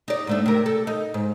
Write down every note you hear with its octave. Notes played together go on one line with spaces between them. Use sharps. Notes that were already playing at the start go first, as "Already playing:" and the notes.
D#4 D5
G#2 A3 D4
C3 A#4
A4
D#4
G#2